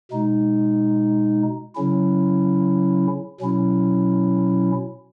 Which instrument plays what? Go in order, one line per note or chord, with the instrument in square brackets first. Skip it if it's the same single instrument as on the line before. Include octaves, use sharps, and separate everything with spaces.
[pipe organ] B2 G#3 D#4
C#3 F#3 C#4 E4
B2 F#3 C#4 E4